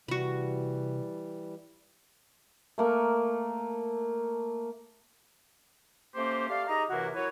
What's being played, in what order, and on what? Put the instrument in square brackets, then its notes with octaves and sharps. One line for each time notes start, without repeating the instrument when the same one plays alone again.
[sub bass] C3 [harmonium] E3 G3 [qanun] F#4 B5
[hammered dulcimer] A3 A#3 A#4
[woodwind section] A3 A#3 C#4 G4 C5
A3 G4 D5 F5
D#4 G4 G#4 A#5
F#2 C3 E3 A#3 E4 F#4
F#3 E4 A#4 B4 C#5